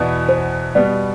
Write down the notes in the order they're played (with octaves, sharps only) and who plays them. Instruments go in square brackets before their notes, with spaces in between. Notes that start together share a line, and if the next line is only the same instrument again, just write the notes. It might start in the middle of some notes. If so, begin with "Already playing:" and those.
Already playing: [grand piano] E2 B2 B3 E4 [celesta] D5
[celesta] C5
[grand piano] B2 G3 B3 [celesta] D5